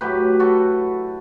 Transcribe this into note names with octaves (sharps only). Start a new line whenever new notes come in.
A2 F#3 G4 B4
F#4 A4